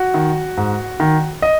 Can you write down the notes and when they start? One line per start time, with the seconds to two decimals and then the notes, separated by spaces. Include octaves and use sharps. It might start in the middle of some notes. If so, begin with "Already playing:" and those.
Already playing: F#4
0.14 D#3
0.57 G#2
1.00 D#3
1.42 D#5